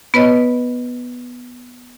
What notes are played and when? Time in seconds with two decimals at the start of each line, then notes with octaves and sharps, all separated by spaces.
0.14 B3 B4 C#5 D#5